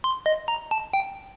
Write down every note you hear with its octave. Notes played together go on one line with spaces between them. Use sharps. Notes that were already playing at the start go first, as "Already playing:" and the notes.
C6
D#5
A#5
A5
G5